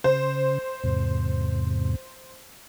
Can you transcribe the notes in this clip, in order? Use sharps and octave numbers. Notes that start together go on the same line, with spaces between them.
C#3 C5
E2 G#2 C3